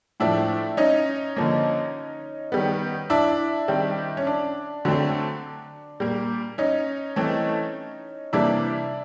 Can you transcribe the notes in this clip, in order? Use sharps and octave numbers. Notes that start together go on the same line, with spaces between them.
A2 F3 A3 D4 E4
C#4 D#4
D3 F3 A#3
D#3 G3 B3
D4 E4
D#3 G3 C4
C#4
D4
D3 F#3 A3 C4
A#2 G3 A#3
C#4 D#4
E3 A3 C4
C3 E3 G3 A#3 D4 E4